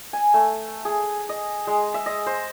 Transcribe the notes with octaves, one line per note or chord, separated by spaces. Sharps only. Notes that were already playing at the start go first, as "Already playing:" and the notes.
G#5
A3
G#4
D#5
G#3
E5
D#5
C5